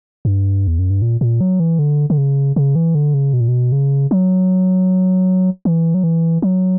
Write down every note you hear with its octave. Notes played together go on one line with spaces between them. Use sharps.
G2
E2
F#2
G2
A#2
A#2
F#3
E3
D3
D3
C#3
C#3
E3
D3
C#3
B2
A#2
B2
C#3
F#3
E3
F#3
E3
F#3